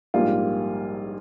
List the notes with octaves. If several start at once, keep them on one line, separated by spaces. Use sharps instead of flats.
A#1 G#2 G3 A#3 F4